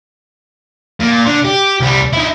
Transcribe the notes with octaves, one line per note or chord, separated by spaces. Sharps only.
A#2
D3
G4
C2 G3
D#4 E4